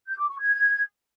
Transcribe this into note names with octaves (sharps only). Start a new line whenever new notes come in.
G6
D6
C#6
G#6